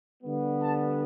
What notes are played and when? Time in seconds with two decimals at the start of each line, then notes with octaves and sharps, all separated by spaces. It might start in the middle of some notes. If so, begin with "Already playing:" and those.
0.23 D3 G3 B3
0.62 A5